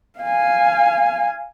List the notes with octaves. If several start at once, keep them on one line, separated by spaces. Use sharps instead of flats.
F5 G#5